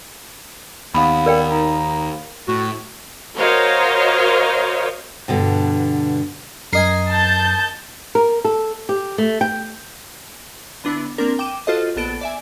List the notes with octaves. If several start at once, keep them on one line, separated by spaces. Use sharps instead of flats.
D#2 B3 F5 B5
A#4 D5 G5
D#4
A2 F#4
F#4 A#4 C5 C#5 D#5 F5
G2 B2 D3
F#2 A#4 D#5 G#5 C7
A5 G6
A#4
A4
G4
A3
G5
D3 B3 D4 E4
A#3 C4 D4 A#4
G5 D6 D#7 E7
F4 F#4 A4 C5 D#5
A#1 B3 A4 D7
D5 E5 G#5